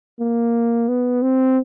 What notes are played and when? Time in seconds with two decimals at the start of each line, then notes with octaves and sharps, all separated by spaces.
0.20 A#3
0.88 B3
1.22 C4